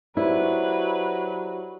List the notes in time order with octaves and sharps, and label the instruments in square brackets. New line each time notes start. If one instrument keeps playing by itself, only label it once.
[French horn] F#3 [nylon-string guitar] E4 [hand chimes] G4 C5 D5 [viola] B4